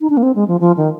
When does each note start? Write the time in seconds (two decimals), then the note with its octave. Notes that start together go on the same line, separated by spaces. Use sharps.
0.01 D#4
0.10 D4
0.17 A#3
0.23 C4
0.35 G#3
0.48 F3
0.60 F3
0.77 D#3